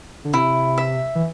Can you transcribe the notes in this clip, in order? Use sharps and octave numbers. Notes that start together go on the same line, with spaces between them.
D3
C3 E4
E5
E3